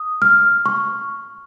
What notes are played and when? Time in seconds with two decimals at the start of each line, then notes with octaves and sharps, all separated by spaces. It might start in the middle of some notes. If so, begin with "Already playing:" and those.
Already playing: D#6
0.22 F6
0.66 C#6